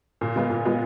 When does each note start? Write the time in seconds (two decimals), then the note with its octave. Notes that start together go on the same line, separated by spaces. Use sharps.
0.21 A#2
0.36 G#3 B3 F4
0.50 A#2
0.65 G#3 B3 F4